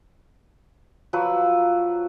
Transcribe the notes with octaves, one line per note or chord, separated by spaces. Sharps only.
F3 F#3 B4 E6